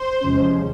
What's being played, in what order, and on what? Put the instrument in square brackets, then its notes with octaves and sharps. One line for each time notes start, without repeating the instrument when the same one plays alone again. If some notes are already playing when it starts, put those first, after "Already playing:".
Already playing: [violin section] C5
[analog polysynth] E2 C3 F3 G#3 C#4